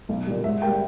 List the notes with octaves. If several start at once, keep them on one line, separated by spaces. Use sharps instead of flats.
B1
A#2 G3
G#2 E5
G3 A#3 G5